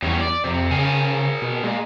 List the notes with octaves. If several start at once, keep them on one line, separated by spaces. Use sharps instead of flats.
E2 F#3 G3 C#4
D5
F2 C3
C#3 G#4 A#4 G#5
B2
A#2 G#3